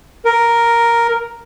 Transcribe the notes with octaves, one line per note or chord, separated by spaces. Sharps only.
A#4